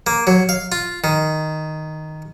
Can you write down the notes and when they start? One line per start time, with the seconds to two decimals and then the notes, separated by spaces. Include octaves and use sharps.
0.07 A#3
0.27 F#3
0.49 F5
0.72 F4
1.04 D#3